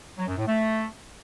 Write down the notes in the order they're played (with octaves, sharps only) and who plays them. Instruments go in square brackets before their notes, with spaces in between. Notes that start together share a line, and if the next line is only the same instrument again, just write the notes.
[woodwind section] F#3
F#2
A2
A3